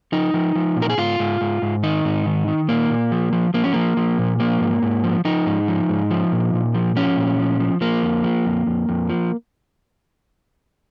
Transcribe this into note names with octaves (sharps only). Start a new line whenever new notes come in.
F3 D#4
F3
F3
A#2
A#4
G#4
G#2 F4
G#2
G#2
G#2
D#3 D#4
G#2
D#3
D#3
A#2 A#3
A#2
F3
F3
F3 A#3
C#4
F3 A#3
F3
A#2
F3 A#3
G#2
G#2
F3
F3 D#4
G#2
F3
G#2
F3
A#2
A#2
F3
F3 C#4
A#2
F3
F3
F3 A#3
F2
F3
F2
F2
F2
F3